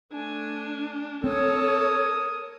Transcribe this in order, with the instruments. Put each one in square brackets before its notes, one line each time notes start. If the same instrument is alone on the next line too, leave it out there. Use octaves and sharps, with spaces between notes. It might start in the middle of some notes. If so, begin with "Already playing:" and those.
[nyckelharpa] A3 G#5 [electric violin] D4
[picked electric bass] C4 [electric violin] A4 [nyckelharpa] A#4 D#6 [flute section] C#5